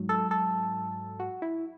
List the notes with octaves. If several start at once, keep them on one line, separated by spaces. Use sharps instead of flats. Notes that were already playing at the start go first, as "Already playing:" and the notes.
Already playing: G#2 F#3
A4
A4
F#4
E4